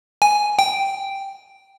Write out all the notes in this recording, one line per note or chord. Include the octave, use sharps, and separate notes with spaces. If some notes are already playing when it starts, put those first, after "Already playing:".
G#5
G5